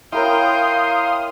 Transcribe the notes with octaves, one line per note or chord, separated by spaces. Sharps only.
E4 A#4 C#5 F5 G5 C6 D#6